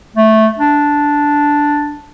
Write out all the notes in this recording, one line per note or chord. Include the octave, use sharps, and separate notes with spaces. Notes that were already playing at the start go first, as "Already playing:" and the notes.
A3
D4